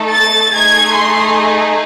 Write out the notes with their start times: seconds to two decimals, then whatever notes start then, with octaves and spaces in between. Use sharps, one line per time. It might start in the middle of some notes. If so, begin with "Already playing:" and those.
Already playing: A3 D#4 A4
0.12 A6
0.53 A3 D#4 G#4 G#6
0.95 C6